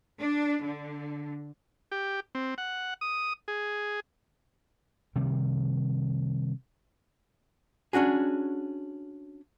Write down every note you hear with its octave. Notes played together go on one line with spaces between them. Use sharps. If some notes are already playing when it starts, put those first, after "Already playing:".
D4
D3
G4
C4
F#5
D#6
G#4
C3 D#3 G3
C#4 D4 F#4 G#4